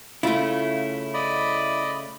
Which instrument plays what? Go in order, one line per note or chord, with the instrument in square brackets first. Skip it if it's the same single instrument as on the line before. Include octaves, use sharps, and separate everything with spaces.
[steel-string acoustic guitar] C#3 A3 [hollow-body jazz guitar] E4 F4
[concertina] D5 D#5 B5